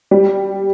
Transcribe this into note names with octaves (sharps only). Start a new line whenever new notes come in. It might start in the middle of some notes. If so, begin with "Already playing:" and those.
G3